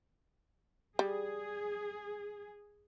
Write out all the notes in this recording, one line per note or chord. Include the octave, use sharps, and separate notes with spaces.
G3 G#4